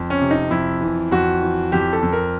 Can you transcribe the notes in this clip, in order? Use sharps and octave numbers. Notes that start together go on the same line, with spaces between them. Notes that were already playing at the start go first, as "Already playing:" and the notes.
Already playing: F2
C#4
C3
D#4
F2 E4
E3
F2 F#4
E3
F2 G4
A4
F2
A#4